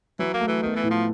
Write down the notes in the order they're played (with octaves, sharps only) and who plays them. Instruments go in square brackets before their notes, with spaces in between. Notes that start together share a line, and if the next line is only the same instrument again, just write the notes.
[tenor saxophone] E3 [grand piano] F#3
[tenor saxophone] A#3
[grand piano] A3
[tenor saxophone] E3
[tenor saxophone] D#3 [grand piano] B3
[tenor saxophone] E3
[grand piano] A2
[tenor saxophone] F3